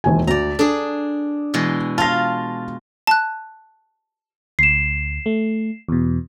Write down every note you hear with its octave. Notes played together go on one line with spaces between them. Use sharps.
E1 D#2 G#5
D2 D5 A#5
D4 G#4 A4
B2 E3 G#3
F4 F5 A5 A#6
A5 F#6
D2 C7 E7
A3
E2 B2